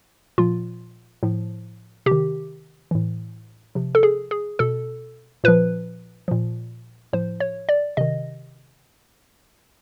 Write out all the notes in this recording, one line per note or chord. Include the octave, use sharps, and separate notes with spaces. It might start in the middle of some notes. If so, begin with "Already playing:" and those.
A#2 F3 F4
A2 F3
C3 G4
D#3
A2 E3
C3 F3
A4
G#4
G#4
B2 A4
A#2 F3 B4
A#2 F3
A2 F3 C5
C#5
D5
C3 D#3 D#5